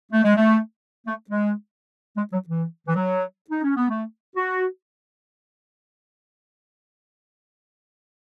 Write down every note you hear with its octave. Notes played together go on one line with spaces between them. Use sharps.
A3
G#3
A3
A3
G#3
G#3
F#3
E3
E3
F#3
D#4
C#4
B3
A3
F#4